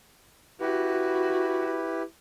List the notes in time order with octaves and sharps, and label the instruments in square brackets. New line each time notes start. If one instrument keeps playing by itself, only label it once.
[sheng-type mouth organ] E4 G4 B4 [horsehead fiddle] F#4